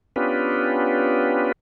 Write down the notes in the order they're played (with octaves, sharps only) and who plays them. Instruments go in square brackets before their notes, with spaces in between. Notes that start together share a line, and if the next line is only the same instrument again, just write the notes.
[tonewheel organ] B3 C#4 D4 F4 G4 B4